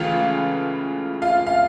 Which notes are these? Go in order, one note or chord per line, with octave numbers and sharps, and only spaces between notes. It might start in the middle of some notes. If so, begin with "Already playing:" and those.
Already playing: C#2 C#3 E3 A3 F4 F5
F4 F5
F5